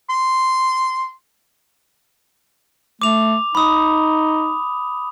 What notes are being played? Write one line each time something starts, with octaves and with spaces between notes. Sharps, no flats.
C6
A3 D6 F7
D#4 B5 D#6